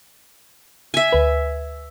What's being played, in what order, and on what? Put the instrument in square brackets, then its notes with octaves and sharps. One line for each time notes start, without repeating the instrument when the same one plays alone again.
[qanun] E5 G#5
[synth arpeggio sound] D2 B4